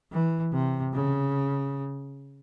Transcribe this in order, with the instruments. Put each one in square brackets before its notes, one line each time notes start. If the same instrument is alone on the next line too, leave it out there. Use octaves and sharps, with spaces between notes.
[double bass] E3
C3
C#3